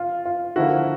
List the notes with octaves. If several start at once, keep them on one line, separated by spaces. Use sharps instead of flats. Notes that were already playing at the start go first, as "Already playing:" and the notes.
Already playing: F4
F4
D3 F3 A#3 E4 F#4